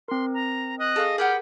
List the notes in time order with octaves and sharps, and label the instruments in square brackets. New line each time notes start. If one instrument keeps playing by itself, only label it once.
[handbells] C4 A#4 [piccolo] C6
[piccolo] A#5
[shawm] D#5 [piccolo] F#6
[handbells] G#4 [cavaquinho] A4 F5 C#6
[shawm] G4 [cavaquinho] G#4 B4 F#5 [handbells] A#4 [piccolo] F6